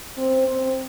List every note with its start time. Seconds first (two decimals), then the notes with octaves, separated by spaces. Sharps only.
0.17 C4
0.47 C4